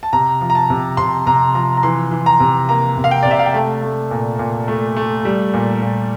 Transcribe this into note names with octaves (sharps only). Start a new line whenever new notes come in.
A5
C3 A#5
F3
A#5
A5
C3
C3 C6
C3 A#5
F3 A#5
A#5
E3 C6
E3
A#5
C3
A#3 A#5
C3
F5
G5
D5
C3
E5
F5
G5
A3 A5
A3
A#2
A#2
A3
A3
G3
A#2
A#2